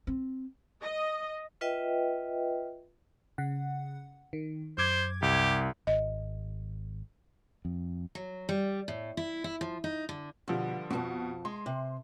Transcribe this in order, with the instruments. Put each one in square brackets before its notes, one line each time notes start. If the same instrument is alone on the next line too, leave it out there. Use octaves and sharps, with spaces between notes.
[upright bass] C4
[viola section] D#5
[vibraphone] F4 B4 D#5 E5 G5
[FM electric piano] C#3 F#5
D#3
[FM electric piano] F#2 D6 G#6 [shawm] C5
[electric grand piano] C2 [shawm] G4
[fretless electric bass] G#1 [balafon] D#5
[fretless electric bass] F2
[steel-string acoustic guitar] F#3
G3
A2
E4
E4
F3
D#4
D3
[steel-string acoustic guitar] B2 [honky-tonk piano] D3 F3 G3
[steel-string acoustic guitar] F2 G#4 A5 [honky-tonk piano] B2
[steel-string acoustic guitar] G#3 [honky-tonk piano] C6
[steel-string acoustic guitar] C3